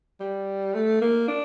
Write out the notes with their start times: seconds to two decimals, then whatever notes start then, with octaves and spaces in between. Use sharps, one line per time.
0.20 G3
0.75 A3
1.02 A#3
1.28 D4